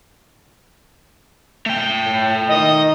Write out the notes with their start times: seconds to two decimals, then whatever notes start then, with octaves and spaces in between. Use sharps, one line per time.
1.66 A3 G5
2.06 A2
2.48 D#3 D#5